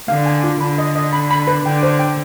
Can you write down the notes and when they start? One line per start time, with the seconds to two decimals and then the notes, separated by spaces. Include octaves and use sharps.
0.08 D3 F5
0.26 G#5
0.44 F4
0.61 D3 B5
0.78 D#5
0.96 D#5
1.13 B5
1.31 B5
1.47 B4
1.65 D3 G5
1.83 C5
1.99 G5